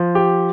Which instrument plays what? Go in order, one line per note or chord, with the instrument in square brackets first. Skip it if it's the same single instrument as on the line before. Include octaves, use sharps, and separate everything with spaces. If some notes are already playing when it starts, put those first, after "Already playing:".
Already playing: [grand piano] F3
G4